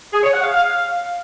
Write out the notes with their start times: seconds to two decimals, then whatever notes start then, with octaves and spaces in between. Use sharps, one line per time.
0.13 G#4
0.23 C#5
0.33 F#5
0.43 F5
0.53 F5